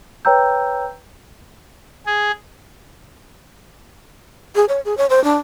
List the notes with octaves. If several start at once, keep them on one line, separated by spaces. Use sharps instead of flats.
B4 C#5 G5 A#5 E6 G6
G#4
G#4
C#5
G#4
C#5
C5
D4